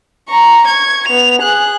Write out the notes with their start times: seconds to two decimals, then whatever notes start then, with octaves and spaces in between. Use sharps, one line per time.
0.29 A#5 C#6
0.67 C#6 G#6
1.08 B3 F7
1.42 G#4 F#6